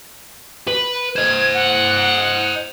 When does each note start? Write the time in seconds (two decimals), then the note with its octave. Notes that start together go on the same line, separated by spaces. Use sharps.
0.68 B4
1.16 C5 D#5 G#6
1.54 F#5